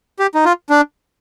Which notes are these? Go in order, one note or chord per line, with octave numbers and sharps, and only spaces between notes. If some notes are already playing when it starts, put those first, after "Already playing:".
G4
D#4
F4
D4